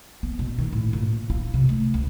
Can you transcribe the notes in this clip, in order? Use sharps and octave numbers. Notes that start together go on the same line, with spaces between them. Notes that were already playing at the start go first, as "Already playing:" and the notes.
B3
B2
D#3
A2
A#2
F4
C3
A3
C#2